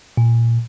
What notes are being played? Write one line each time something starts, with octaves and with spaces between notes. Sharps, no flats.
A#2